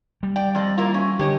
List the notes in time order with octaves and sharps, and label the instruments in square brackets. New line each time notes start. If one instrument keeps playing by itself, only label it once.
[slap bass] G3
[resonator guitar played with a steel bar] D5 G5
F2 D5 D#5
A#3 E4 F4
C#4
[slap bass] D3 [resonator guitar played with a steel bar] G4 C#5 D#5